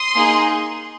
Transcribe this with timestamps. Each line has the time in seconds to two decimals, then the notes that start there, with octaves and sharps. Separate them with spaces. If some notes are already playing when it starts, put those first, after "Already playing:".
Already playing: C6 D#6
0.15 A#3 D#4 G#4